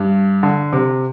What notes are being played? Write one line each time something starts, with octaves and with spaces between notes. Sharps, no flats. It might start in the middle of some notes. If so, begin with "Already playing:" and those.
Already playing: G2
D3
C3